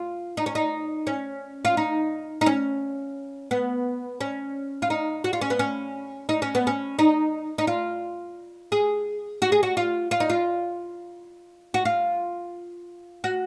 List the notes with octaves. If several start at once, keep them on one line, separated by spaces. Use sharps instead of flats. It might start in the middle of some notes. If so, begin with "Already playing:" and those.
Already playing: F4
D#4
C#4
D#4
C#4
F4
D#4
D#4
C#4
B3
C#4
F4
D#4
F#4
F4
C#4
B3
C#4
D#4
C#4
B3
C#4
D#4
D#4
F4
G#4
F#4
G#4
F#4
F4
F4
D#4
F4
F#4
F4
F#4